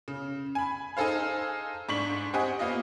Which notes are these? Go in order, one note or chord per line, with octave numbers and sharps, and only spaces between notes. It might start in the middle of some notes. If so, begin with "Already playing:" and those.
C#3
G#5 B5
D#4 G#4 A4 C5 F5
G#2 D4 C#6 B6 F#7
C4 G4 D#5 F#5 G#5
A#3 B3 F4 D#5